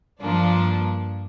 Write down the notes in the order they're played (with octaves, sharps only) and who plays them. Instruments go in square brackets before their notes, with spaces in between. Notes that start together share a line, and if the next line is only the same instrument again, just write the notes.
[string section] G2 F3 A#3 D4